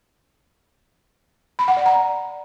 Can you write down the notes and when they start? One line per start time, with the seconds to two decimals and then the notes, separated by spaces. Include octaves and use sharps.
1.59 B5
1.68 F#5
1.77 D5
1.86 A#5